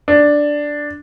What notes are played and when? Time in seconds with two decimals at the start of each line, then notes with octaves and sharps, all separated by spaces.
0.08 D4